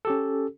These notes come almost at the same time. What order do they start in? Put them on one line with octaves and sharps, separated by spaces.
A4 G4 C#4